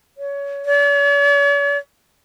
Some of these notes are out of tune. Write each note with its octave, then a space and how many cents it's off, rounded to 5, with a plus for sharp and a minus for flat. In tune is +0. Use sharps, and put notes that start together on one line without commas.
C#5 +25
C#5 +45